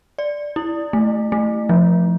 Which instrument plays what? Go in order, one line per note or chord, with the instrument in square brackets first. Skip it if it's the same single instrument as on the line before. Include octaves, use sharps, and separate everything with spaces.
[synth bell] D5
E4
A3
A3
F3